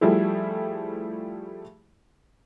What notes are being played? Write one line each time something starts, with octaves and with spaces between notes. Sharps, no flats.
F3 G3 A3 E4 G#4